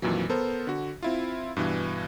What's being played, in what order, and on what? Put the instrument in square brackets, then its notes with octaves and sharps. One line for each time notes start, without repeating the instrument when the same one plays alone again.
[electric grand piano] F2 A#2 D#3 E3 F#3
B3 A4 A#4 C5
D3 F#4
C4 E4 F4
G2 B2 E3